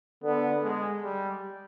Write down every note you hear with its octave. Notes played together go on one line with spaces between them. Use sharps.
D3 B3
G#3
G3